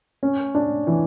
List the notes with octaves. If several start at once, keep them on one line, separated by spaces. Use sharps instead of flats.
C#4
D4
E3